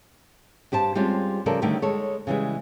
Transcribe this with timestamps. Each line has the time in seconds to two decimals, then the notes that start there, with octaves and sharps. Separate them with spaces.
0.72 G2 G4 C5 A5
0.95 G3 G#3 C4 C#4 F4 G4
1.46 C#3 F3 G3 A4 A#4 D5
1.62 D3 D#3 G3 A3 G4 A#4
1.82 G#3 A4 C#5
2.27 C#3 E3 G3 G#3